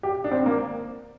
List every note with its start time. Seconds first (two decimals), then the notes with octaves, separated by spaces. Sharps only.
0.03 G4
0.24 D4
0.31 C4
0.46 A#3